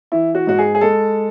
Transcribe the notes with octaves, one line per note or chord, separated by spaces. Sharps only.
E3 E4
F#4
G#2 F#4
G#4
G#4
G#3 A4